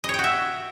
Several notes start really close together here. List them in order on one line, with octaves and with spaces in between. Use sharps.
D#5 C#5 G5 F#4 E5